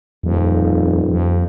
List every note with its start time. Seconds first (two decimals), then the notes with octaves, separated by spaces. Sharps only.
0.24 D#1 F2
1.09 F2